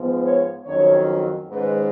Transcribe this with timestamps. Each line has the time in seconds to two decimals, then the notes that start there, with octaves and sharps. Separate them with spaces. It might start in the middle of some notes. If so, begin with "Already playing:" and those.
Already playing: G#2 F3 B3
0.24 C#5
0.66 F2 D#3 F#3 C#4 C#5
1.50 G#2 D#3 G#3 C#4 B4